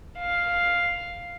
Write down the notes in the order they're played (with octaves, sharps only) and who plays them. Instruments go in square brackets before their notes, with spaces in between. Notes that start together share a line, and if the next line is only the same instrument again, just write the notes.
[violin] F5